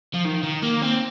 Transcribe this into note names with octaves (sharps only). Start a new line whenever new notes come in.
F3
D#3
D#3
A#3
C4